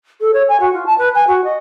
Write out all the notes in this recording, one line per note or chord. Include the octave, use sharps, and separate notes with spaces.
A4
C#5
G#5
F#4
F4
A5
B4
G#5
F#4
D#5